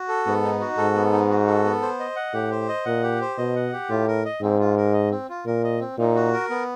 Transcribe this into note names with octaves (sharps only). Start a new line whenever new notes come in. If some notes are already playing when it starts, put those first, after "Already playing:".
Already playing: F#4
A4
G#2 B3
D#4
F#4
G#2 A4
B3
D#4
F#4
A4
B3
C5
D#5
F#5
A2 G4
C5
D#5
A#2 F#5
G4
C5
B2 D#5
F#5
G4
A2 F4
A#4
D#5
G#2 C4
F4
A#4
D#5
C4
F4
A#2 A#4
D#5
C4
A#2 D#4
F#4
A#4
B3